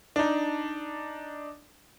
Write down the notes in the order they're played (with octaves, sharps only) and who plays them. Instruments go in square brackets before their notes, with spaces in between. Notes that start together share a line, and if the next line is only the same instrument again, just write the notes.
[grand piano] D4 D#4